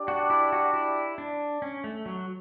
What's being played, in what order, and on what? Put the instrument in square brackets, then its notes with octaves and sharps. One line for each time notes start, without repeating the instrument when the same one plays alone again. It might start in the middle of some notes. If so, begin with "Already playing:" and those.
Already playing: [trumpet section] D4 G4 D5
[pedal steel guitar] F#4
E4
F#4
E4
D4
C#4
A3
F#3